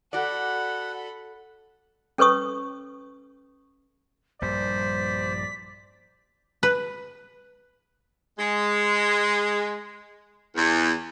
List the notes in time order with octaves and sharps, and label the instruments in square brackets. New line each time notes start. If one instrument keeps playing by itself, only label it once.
[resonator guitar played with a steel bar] F#4 D5 [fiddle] A4 B5 [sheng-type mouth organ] F#5
[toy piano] C#4 A4 B4 C#5 C#6 D#6
[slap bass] A#1 G2 G3 [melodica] C5 [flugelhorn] D5 [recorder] B6
[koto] B4
[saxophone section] G#3
E2